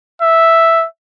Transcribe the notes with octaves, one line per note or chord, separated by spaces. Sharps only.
E5